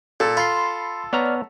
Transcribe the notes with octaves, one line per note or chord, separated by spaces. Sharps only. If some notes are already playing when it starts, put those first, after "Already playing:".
A#2 A4
F4 B5 C6 C7
B3 C#5 D5 A#5 F6